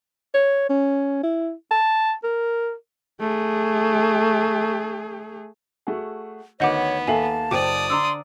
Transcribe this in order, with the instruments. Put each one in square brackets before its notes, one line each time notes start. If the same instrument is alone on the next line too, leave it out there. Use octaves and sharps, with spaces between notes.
[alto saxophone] C#5
C#4
E4
A5
A#4
[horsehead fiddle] A3 G#4
[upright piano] A3 F#4 G#4
[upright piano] D2 D#3 G6 [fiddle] B3 [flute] C#5 [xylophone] D#5 F#5 D6
[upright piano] D#2 A#3 C7 [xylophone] A4 E5 G#5 [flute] A5
[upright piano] F#1 [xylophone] C5 G5 D6 [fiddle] D5 D#6
[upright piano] D3 D4 [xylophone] A#5 D6 E6 [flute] C6